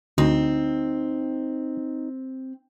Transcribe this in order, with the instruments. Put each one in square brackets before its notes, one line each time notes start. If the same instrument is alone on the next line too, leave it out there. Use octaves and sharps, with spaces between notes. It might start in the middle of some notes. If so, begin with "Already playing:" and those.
[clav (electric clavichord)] D2 [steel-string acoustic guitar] C4 [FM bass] D#4